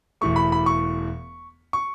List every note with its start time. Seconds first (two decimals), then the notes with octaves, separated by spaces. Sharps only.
0.21 E1 E2 E3 A3 C#6
0.36 B5
0.52 B5
0.66 C#6
1.73 C#6